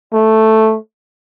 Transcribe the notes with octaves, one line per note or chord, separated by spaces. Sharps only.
A3